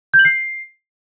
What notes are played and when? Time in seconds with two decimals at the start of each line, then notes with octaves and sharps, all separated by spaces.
0.14 G6
0.19 F#7
0.25 C7